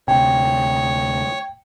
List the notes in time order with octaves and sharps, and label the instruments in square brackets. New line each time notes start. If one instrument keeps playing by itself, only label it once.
[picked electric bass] D2 C3 [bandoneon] C#5 [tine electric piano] G5